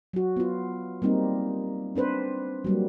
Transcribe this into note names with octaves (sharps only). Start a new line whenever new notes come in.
F#3 F#4
B3 F4
G3 A#3 C4 D#4
C4 D4 B4 C5
F#3 G3 A#3